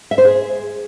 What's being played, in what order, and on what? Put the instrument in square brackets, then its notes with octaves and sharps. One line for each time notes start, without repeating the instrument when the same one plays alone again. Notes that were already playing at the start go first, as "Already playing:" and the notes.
[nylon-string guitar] E5
C5
G#4